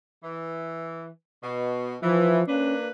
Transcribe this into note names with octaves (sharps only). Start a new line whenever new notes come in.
E3
B2
E3 F3
A#3 C#4 D4 B4